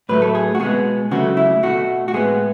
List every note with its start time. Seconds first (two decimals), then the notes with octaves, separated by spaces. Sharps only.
0.09 A2 F#3 A3 B4
0.22 A4
0.35 G#4
0.55 F#4
0.60 B2 G#3 B3 G#4
1.11 C#3 F#3 A3 F#4
1.37 E4
1.63 B2 A3 F#4
2.08 F#4
2.14 A2 G#3 B3 G#4